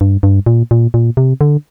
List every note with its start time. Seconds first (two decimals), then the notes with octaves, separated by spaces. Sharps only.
0.01 G2
0.23 G2
0.46 A#2
0.71 A#2
0.94 A#2
1.17 C3
1.41 D3